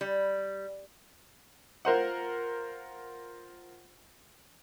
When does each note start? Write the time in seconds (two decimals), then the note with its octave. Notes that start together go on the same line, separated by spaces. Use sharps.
0.01 G3
1.85 F4 A#4 C5 F#5